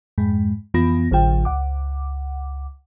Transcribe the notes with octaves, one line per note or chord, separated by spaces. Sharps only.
F2 G#2 G#3
F2 E3 B3 F4 B5 A#6
A1 D3 F#3 F4 G5
C#2 F#5 D6